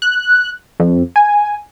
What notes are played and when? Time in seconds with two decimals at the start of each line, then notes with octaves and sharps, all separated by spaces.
0.02 F#6
0.80 F2
1.16 G#5